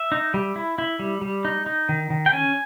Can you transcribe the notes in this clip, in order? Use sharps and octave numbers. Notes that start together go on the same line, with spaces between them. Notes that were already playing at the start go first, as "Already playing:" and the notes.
Already playing: E5
D#4
G3
E4
E4
G3
G3
D#4
D#4
D#3
D#3
G5
C#4 G#5